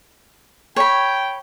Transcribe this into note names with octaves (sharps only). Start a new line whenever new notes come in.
C#5 G5 B5